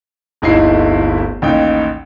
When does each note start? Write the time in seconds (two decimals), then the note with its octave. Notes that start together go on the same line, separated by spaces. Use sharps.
0.42 D1 G1 D#4 E4 E5 C7
1.42 A1 D#2 D#4 G5